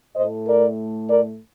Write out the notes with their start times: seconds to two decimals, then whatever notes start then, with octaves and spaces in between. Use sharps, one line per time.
0.15 A2 A3 C5 D#5
0.47 A#4 D5
1.10 A#4 D5